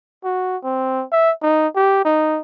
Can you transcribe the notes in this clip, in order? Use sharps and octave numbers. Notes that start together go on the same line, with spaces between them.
F#4
C4
E5
D#4
G4
D#4